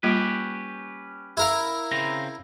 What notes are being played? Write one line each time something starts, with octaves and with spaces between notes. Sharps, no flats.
G3 A#3 C#4 F4 G4 B4
E4 A#4 F5
C#3 C4 A#5